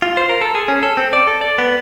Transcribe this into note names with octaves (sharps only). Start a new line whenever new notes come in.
F4
C5
A#4
A4
G#4
C#4
A4
C4
D5
A4
D5
B3